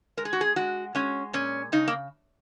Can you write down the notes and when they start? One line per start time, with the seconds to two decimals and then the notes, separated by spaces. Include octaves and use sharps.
0.17 G#3 A#4
0.25 G#4
0.33 F#4
0.41 G#4
0.56 G#3 F#4
0.95 G#3 C#4
1.33 A#2 C#4
1.72 C#3 D#4
1.88 A#3